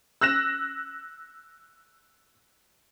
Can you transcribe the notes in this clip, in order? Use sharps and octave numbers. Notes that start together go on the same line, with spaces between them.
E6 F#6 A#6 E7